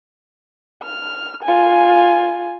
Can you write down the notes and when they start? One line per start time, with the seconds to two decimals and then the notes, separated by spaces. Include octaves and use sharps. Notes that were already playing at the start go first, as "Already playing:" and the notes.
0.83 F6
1.43 F4 G#5